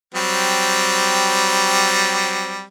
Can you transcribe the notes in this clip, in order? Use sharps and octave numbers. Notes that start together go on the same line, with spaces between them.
F#3 G3 C4